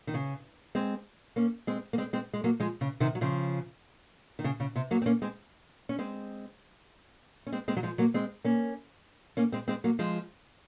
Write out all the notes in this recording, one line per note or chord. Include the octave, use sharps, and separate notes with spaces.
D#3
C#3
G#3 C4
A#3 C#4
G#3 C4
A#3
G#3 C4
G#3 C4
G#3
F#3 A#3
F3 G#3
C#3
C3 D#3
F#3
C#3 F3
D#3
C#3
C#3
C3
F#3 A#3
C4
A#3 C#4
G#3 C4
C#4
G#3 C4
C#4
G#3 C4
G#3 C4
F#3
F3 G#3
F#3 A#3
G#3 C4
A#3 C#4
A#3 C#4
G#3 C4
G#3 C4
F#3 A#3
F3 G#3